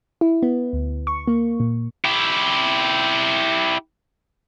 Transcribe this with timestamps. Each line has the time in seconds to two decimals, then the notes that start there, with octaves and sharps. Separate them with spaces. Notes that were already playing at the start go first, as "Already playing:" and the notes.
0.21 E4
0.43 B3
0.73 D2
1.07 C#6
1.27 A#3
1.60 A#2
2.05 E4 G4